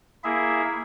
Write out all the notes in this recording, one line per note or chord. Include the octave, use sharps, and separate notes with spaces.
A#3 E4 G#4 E5